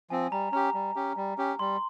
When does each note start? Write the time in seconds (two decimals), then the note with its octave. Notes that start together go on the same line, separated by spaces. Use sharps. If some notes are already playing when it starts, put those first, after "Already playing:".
0.10 F3 C4 G#5
0.32 G3 A#5
0.52 C#4 G4 A#5
0.74 G3
0.96 C#4 G4
1.17 G3
1.38 C#4 G4
1.59 G3 C6